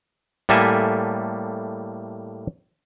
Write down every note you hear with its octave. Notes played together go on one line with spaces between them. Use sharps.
A2 G3 A#3 A4 E5 G#5